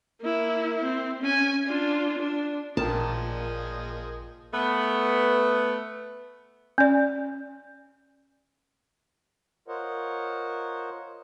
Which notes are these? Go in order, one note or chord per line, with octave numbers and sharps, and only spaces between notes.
A#3 E4
C4
C#4 G#5
D4 F4
D4
A1 A#2 F3 G#4 A#4 D#5 G5 A5
A3 B3
C#4 D5
F4 A#4 C5 C#5 D#5 F#5